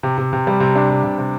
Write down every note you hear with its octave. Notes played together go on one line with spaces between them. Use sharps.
C3
C3
C3
G3
C3
D4
C3
C3
C3